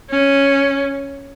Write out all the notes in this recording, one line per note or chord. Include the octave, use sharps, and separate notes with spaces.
C#4